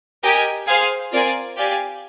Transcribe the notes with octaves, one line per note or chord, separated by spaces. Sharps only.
G4 A#4 D#5 G#5
G#4 C5 F5 G#5
C4 F4 A#4 D5 G#5
G4 D5 F5 G#5